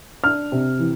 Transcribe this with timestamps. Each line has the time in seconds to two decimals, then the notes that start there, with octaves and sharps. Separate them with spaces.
0.24 D4 F6
0.52 C3
0.79 E3